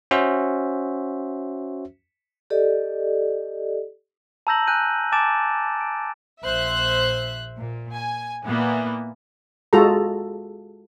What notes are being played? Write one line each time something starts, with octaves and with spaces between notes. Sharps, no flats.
C#4 F#4 C5 E5
G4 A4 D5 D#5
A5 A#5 E6 G6 A#6 F#7
G#5 A5 F#6 G6 D#7
G#5 A5 D6 A6 D7 E7
D7
A#1 C5 E5 F#6
A#2
G#5
A#2 E3 A#3 B3
G#3 F4 F#4 G#4 A4 A#5